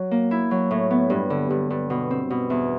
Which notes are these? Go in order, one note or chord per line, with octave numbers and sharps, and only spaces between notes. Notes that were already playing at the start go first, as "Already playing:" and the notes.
Already playing: F#3
A#3
E4
F#3
A2
B3
G2
D3
G2
G2
B2
C4
B2
E2